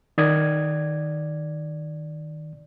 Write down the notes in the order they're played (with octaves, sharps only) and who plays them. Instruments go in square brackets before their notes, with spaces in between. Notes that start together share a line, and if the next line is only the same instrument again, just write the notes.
[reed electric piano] D#3 D5 D#6 G#6